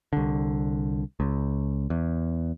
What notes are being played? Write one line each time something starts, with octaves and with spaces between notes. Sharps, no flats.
C2 D3
C#2
E2